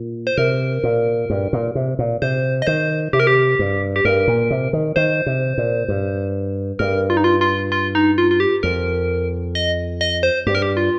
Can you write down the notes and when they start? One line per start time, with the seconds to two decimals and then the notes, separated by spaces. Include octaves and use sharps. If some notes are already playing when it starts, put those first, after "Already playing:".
Already playing: A#2
0.27 C5
0.37 C3 A#4
0.83 A#2
1.30 G2
1.53 A#2
1.75 C3
1.99 A#2
2.22 C3 C5
2.62 D#5
2.67 D#3 C5
3.13 C3 G4
3.20 A#4
3.27 G4
3.59 G2
3.96 G4
4.05 G2 A#4
4.28 A#2
4.51 C3
4.73 D#3
4.96 D#3 C5
5.26 C3
5.58 A#2
5.88 G2
6.79 G2 A#4
7.10 F4
7.17 D#4
7.24 F4
7.41 F4
7.72 F4
7.95 D#4
8.18 F4
8.31 F4
8.40 G4
8.63 F2 A#4
9.55 D#5
10.01 D#5
10.23 C5
10.46 G2 G4
10.55 A#4
10.62 G4
10.77 F4